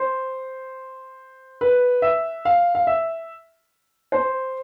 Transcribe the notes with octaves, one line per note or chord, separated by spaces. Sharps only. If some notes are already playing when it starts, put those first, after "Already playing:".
Already playing: C5
B4
E5
F5
F5
E5
C5